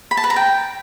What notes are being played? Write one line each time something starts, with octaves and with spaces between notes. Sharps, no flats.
B5
A5
B4
A#5
G5